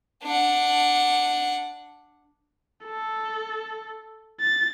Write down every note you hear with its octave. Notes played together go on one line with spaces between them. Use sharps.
D4 F#5
A4
A6